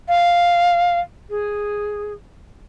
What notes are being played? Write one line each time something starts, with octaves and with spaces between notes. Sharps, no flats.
F5
G#4